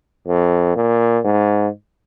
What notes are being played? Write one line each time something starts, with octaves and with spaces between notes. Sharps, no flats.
F2
A#2
G#2